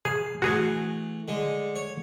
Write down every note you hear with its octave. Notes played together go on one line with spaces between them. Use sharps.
G#4 F5
E3 A3 F#4 G#4
D3 G#3
C#5